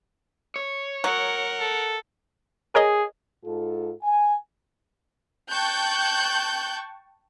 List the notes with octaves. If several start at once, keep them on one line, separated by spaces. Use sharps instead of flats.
C#5
F#3 A#4 F#5
A4
G#4 A#4 C#5 D#5
G#2 F4 A4
G#5
G5 A5 C#6 F#6 G6